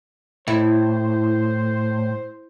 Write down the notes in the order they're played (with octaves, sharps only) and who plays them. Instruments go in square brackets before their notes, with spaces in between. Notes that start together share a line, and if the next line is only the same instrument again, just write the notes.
[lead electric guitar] A2 [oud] E4 [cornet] C5